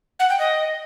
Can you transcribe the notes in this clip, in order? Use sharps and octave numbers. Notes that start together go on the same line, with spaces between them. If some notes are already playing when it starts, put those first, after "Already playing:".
F#5
G5
D#5